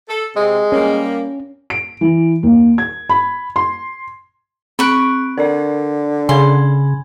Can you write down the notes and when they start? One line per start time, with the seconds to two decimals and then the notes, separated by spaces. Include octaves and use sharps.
0.09 A4
0.36 C3 G#3
0.72 G3 A#3 C#4
1.70 D7
2.01 E3
2.43 D#2
2.78 G#6
3.10 B5
3.56 C6
4.79 C4 B5 C#6 F#6 D7
5.38 D3 A#4 D5
6.29 C#3 G#5 B5 C6 G#6